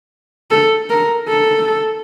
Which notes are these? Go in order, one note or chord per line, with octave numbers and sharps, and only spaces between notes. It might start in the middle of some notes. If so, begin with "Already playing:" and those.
A4
A#4
A4